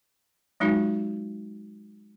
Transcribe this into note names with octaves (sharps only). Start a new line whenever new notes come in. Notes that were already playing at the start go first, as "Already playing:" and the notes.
F#3 G#3 D#4 F4 F#4